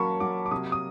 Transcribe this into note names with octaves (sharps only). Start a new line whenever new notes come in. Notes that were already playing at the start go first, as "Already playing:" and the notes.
Already playing: F#3 A#3 C#4 A5 B5 C#6
F#3 D6
D6
C3 D#6
D#6